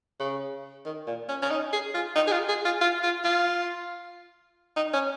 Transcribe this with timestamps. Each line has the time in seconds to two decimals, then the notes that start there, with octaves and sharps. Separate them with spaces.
0.20 C#3
0.85 D#3
1.07 A#2
1.29 C#4
1.42 C#4
1.50 D#4
1.73 G#4
1.94 F4
2.15 D#4
2.27 G#4
2.32 F4
2.49 G#4
2.65 F4
2.81 F4
3.03 F4
3.24 F4
4.76 D#4
4.93 C#4